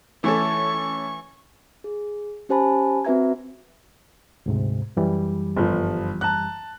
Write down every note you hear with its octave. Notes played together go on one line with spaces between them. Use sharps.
E3 A3 C#4 A4 C#6
G#4
C#4 G4 C5 G#5 A5 B5
C4 F#4 B4 E5 A#5 G#6
D2 G#2 C3
F#2 E3 G3
G1 F3
A5 A#5 F#6